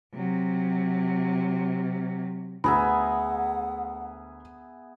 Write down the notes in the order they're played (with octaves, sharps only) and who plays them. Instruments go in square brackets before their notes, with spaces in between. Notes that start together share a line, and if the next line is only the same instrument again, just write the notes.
[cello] C3 F#3
[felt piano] D2 A#5 [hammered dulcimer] B3 G#4 E5 [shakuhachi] F#5 [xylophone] B5